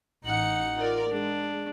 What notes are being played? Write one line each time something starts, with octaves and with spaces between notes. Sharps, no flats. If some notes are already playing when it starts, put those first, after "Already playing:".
A1 D#4 F#5 C#7
F4 A#4 D5
G#3 D4